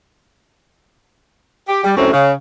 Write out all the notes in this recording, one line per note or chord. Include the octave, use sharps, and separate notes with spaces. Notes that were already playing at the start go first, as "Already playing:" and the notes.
G4
G3
F#2 A2 D3 C4 C#4
C#3